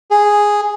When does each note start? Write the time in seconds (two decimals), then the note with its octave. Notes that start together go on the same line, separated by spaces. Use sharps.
0.11 G#4